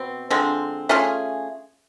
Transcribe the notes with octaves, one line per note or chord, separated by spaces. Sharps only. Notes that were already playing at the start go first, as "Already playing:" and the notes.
Already playing: B2 C4
D3 F3 G#3 C4
A3 C#4 F4 G#4